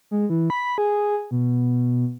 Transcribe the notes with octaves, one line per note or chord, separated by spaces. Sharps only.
G#3
E3
B5
G#4
B2